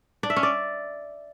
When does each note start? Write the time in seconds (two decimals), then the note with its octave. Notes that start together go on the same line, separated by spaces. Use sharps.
0.23 D4
0.30 E5
0.36 C#4
0.43 D5